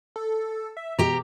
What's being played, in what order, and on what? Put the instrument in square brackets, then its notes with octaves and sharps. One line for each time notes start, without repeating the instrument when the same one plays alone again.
[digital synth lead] A4
E5
[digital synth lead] B2 [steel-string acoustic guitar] G4 A#5